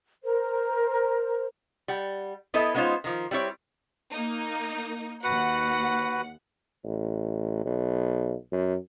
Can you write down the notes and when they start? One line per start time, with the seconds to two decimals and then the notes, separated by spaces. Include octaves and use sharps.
0.23 A#4 C5
1.88 G3 F#5
2.54 B3 E4 A4 B4 D#5
2.74 G#3 B3 C#4 D#4 F4 C5
3.04 D#3 F3
3.31 G3 C4 E4 C#5 D5
4.12 A#3 D#4
5.24 D#2 F#4 B4 F#5
6.84 A1
7.65 B1
8.52 F#2